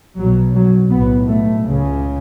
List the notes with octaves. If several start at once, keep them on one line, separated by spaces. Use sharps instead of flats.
B1 B2 F#3
F#3
B1 A2 B3
A3
C#2 C#3